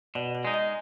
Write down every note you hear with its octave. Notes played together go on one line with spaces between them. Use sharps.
B2 D5
D5
G#3 D#4
D#5